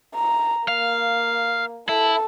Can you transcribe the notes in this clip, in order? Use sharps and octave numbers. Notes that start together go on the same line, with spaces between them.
A#5
A#3 F5
E4 A4 A5